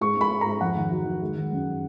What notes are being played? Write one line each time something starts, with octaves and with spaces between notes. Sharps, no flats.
G#2 C#6
G#2 B5
G#2
G#2 A#5
F2 F#5
D#3
F#3
D#3
G#3
D#3
F#2